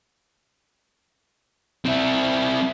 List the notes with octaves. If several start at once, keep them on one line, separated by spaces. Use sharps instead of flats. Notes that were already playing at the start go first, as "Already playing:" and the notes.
C4 E4